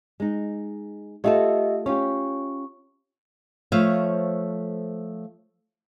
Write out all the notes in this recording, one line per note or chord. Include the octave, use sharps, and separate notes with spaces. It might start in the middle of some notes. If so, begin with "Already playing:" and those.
G#3 D#4
A3 F4 G4 A4 D#5 E5
C#4 F4 G4 C#6
F3 A3 C5 C#5 E5 F5